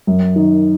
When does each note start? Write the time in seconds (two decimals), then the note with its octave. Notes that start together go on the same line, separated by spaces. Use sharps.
0.07 F#2
0.36 D#3